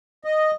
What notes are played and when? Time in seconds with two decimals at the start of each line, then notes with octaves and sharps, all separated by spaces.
0.24 D#5